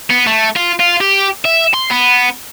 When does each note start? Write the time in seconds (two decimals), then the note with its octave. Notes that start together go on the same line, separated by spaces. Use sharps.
0.10 B3
0.27 A3
0.56 F4
0.80 F4
1.01 G4
1.45 E5
1.74 C6
1.90 B3